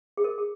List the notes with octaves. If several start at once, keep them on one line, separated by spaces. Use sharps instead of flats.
G#4
A#4
G#4